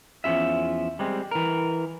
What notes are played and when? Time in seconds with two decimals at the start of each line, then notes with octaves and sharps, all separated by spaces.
0.24 E2 F3 C#4 F4 E5
0.99 G3 G#3 C4
1.31 E3 A#4